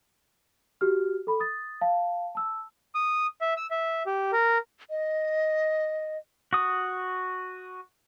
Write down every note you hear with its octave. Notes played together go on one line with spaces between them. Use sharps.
F#4 G4 F6
A4 B5
D#6 A6
F5 A5
A5 E6
D#6
E5
E6
E5
G4
A#4
D#5
F#4 D#6